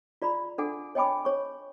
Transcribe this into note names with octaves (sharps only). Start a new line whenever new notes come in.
F4 D5 A#5 B5
D4 A4 F#5 G#5 D6
C#5 D#5 G5 G#5 B5 D6
C#5 C#6